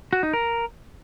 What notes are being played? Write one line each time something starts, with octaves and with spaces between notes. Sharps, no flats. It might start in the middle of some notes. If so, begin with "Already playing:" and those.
F#4
D#4
A#4